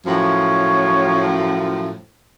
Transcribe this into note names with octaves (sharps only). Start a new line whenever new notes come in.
F#2 A2 F3 C#5